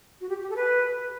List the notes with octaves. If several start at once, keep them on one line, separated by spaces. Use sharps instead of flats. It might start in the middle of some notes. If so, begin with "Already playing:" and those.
F#4
G4
G4
A4
B4